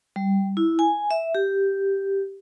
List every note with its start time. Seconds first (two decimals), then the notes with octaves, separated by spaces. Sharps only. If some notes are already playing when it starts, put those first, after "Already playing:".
0.16 G3
0.57 E4
0.79 G#5
1.11 E5
1.35 G4